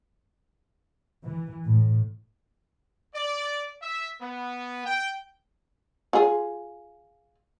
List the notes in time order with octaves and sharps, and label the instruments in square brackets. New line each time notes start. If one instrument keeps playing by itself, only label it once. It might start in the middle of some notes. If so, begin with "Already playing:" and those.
[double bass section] E3
A2
[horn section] D5
E5
B3
G5
[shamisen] F4 G#4